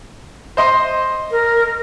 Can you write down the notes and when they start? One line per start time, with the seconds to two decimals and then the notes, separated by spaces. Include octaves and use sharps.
0.57 C5 D#5 C6
1.31 A#4